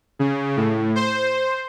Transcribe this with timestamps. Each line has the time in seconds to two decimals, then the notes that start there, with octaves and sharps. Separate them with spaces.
0.19 C#3
0.57 A2
0.96 C5